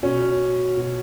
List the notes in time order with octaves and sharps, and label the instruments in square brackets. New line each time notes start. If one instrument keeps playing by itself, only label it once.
[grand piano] B2 C#4
B2